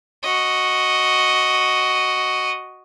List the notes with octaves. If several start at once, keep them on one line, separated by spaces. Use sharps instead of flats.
F#4 D#5